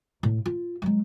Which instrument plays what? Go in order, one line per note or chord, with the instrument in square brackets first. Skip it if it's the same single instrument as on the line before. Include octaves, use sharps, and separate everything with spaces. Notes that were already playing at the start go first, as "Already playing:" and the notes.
[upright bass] A2
F4
F#3 G#3